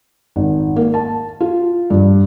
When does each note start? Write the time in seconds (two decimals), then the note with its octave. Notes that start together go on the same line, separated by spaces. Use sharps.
0.36 G#1
0.76 A#3
0.94 A5
1.40 F4
1.90 G2